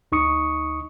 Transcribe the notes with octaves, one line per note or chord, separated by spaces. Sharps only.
D2 D#4 C#6 D#6 C#7